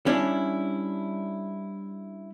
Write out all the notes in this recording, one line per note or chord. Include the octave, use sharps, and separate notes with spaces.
G3 C#4 D4 E4